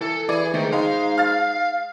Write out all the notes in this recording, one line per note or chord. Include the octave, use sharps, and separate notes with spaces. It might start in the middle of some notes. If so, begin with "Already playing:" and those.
E3 A4
E3 G#4 D5
G#2 D#3 A3
G#3 D#4 F5
F6 A6